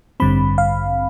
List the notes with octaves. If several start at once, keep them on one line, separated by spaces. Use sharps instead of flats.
A1 G2 D3 G3 C4 B5
F5